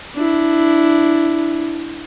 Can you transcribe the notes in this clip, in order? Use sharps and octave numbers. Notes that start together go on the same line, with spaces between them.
D4 E4